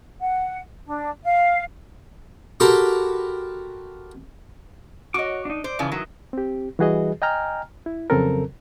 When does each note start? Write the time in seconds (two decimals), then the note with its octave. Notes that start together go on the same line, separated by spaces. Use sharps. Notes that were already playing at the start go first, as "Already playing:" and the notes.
0.20 F#5
0.85 D4
1.25 F5
2.60 F#4 G4 A4 A#4 B5 C6
5.14 F#4 C#5 D#5 D6
5.45 D4 D#4
5.64 C5 D5
5.79 C#3 E3 F3
5.92 D#3 E3 F#3 D#5
6.33 C4 G4
6.79 E3 G3 F#4 G#4 B4 D#5
7.22 D#5 G5 G#5 A#5 F6
7.86 E4
8.10 F2 C#3 F#3 C4 A4 A#4